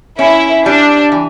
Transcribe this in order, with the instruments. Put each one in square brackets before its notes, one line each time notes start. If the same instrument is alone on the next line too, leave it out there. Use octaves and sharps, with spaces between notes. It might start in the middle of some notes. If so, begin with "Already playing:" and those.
[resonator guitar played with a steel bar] C#4 [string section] E4
[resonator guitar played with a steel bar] G3 [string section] D4
[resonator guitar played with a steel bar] E3